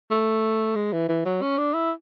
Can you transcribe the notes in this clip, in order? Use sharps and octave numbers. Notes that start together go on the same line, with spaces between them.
A3
G#3
E3
E3
F#3
C#4
D4
E4